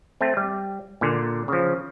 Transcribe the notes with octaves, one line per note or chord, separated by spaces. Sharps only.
A3 C4
G3
A#2 D3
C#3 F3